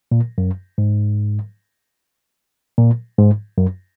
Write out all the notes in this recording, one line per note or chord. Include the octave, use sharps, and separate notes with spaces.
A#2
F#2
G#2
A#2
G#2
F#2